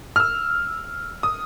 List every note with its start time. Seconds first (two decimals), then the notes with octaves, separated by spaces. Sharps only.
0.16 F6
0.20 E6
1.23 D#6